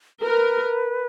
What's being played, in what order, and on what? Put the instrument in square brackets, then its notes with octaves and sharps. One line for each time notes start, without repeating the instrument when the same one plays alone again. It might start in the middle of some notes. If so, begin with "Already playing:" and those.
[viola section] A#4 [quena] B4